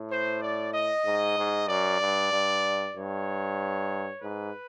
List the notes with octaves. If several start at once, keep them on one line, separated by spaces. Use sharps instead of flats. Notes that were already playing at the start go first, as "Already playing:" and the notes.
Already playing: A2
C5
D5
D#5
G#2
G#2
F#2 D5
G2
G2
G2 C#5
G#2 B4